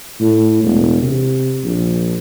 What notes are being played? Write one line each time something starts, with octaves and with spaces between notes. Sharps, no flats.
A2
E1
C3
A#1